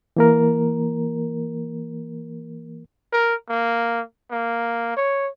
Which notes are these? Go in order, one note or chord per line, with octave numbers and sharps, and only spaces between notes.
E3 A#3 A#4
A#4
A#3
A#3
C#5